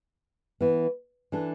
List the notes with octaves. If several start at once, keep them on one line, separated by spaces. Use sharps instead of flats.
E3 B3 E4
E3 D4 A4